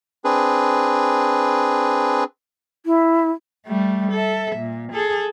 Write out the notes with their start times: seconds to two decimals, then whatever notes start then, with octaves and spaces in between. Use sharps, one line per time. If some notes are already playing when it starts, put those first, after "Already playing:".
0.24 C4 D4 G#4 B4
2.86 E4
3.67 G3 A3
4.12 A4 E5
4.56 A#2
4.93 G#4 A4